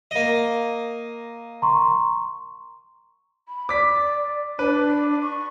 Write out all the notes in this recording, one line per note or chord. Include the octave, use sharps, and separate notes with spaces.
A#3 D#5
A#5 C6 C#6
B5
D5 D6 B6
D4 B4
C#6